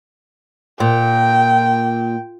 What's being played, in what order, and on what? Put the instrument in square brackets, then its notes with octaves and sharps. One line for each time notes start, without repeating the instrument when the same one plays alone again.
[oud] A#2 [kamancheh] G5